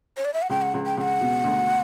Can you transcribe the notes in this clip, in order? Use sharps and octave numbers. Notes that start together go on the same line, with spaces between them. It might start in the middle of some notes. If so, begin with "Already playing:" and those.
C#5
D5
E5
F#5
C#2 G5
F#5
C#2
G5
C#2 F#5 G5
B2
D2